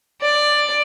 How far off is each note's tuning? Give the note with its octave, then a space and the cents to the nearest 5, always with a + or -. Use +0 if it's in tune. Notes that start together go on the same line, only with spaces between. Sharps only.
D5 +10